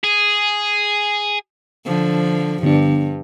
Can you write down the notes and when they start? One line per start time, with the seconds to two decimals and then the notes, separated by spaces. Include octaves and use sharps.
0.04 G#4
1.85 D3 F3
2.63 G2 D3 B3 D4